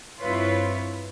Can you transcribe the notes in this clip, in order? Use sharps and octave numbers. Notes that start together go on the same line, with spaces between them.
G2 C4 E4 F4 B4 C#5